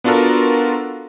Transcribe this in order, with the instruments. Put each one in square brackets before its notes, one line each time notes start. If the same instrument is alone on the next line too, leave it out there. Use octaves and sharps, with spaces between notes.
[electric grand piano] B3 D4 F4 F#4 A4 A#4